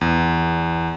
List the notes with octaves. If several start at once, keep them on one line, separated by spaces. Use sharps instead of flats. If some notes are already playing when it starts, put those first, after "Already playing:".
E2